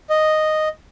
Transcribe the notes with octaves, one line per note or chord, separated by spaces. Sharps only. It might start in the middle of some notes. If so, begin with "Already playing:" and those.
D#5